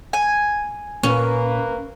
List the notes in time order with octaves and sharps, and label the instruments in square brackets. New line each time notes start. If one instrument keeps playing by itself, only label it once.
[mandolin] G#5
[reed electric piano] A#2 [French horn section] A#3 B4 [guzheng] C#4